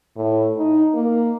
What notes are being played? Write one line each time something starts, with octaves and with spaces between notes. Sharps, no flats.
A2
D#4
A#3